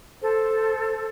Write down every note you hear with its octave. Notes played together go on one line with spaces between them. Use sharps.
A4 C5